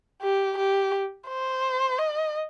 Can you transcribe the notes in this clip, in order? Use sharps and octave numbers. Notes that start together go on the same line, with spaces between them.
G4
G4
C5
D#5